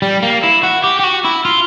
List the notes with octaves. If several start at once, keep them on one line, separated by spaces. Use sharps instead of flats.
G3
A#3
E4
F#4
G4
G4
F#4
E4
F4